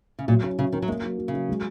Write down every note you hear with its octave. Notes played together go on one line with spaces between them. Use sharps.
C#3
A#2 F#3
C#3 C#4
C#3 F#3
D#3 C#4
F#3
G#3 A#3
F#3
F#3
C#3
F#3
G#3